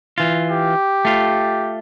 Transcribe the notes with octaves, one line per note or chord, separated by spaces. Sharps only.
E3 F4
G4
A3 F4